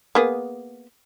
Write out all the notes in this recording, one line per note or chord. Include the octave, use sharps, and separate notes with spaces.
A#3 B3 G#4